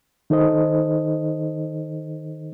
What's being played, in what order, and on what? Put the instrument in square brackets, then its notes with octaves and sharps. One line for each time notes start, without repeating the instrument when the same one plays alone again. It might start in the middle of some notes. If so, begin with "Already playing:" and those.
[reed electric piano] D#3 D#4 A4 C5 D#5